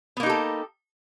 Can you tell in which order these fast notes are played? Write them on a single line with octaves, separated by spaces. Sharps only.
B3 A#3 D#4 G4 A4